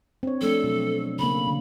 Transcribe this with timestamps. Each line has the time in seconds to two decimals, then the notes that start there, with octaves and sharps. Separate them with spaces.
0.23 C4 D4 C#5
0.41 F3 A3 D4 A4
0.64 B2 F#3
1.19 C#3 A#3 B5
1.48 D3